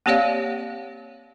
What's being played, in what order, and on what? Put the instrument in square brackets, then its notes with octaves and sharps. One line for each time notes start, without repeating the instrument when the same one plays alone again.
[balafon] A#3 C4 G4 C#5 D5 F5